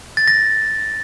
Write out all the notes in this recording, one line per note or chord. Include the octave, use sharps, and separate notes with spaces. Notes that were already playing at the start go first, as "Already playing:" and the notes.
A6
A#6